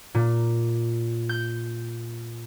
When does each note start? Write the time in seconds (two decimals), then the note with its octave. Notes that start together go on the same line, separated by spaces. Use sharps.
0.15 A#2
1.29 G6